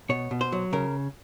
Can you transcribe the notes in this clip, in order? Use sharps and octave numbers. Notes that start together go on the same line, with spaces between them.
B2 C#5
B2
C5
F#3
C#3 A#4